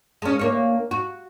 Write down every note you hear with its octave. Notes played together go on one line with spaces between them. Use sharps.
G#3 C#4
D2 A#3 C#5
F#4